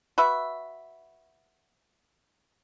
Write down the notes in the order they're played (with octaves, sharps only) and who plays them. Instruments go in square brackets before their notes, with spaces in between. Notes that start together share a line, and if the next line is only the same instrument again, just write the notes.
[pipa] F#4 B4 E5